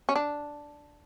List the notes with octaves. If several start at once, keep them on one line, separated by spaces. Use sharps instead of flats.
C#4
D4